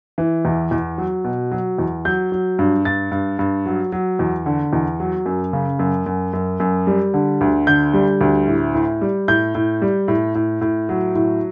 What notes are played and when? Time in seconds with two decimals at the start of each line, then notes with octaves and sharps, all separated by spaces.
0.18 E3
0.45 E2
0.71 E2
0.98 F#3
1.24 B2
1.52 F#3
1.78 E2
2.05 F#3 G6
2.32 F#3
2.59 G2
2.85 G2 A6
3.12 G2
3.39 G2
3.66 F#3
3.92 F#3
4.19 E2
4.46 D3
4.73 E2
5.00 F#3
5.26 F#2
5.53 C#3
5.79 F#2
6.06 F#2
6.33 F#2
6.60 F#2
6.87 G3
7.14 D3
7.41 D2
7.67 D3 G6
7.94 G3
8.21 D2
8.47 A2
8.75 A2
9.02 G3
9.28 A2 G6
9.55 A2
9.82 G3
10.08 A2
10.35 A2
10.61 A2
10.89 F#3
11.15 A2